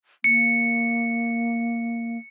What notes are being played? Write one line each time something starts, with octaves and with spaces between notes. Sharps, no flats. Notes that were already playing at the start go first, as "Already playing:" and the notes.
A#3 C#7